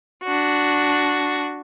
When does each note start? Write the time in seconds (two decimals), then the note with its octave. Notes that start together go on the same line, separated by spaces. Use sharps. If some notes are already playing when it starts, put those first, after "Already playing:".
0.24 D4 F#4